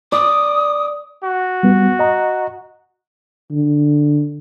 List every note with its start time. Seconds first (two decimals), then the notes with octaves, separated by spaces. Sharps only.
0.12 D5 D#6
1.24 F#4
1.63 G3 B3
1.99 D#5 A#5
3.51 D3